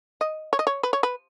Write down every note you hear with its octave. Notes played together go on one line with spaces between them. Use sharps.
D#5
C#5
D#5
C#5
B4
C#5
B4